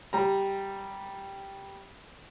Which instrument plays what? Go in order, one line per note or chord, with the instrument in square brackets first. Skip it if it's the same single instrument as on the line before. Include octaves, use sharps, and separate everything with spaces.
[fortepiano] G3 A#5